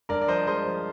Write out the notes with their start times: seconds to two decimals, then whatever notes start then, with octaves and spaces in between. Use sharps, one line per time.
0.09 G2 A#4 D5
0.22 D5
0.28 F3 C5 D#5
0.47 G#3 C5 D#5
0.66 F3